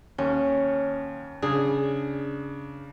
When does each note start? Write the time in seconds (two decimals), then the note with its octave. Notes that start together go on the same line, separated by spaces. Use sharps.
0.18 D#2 C#4
1.42 C#3 D4 G#4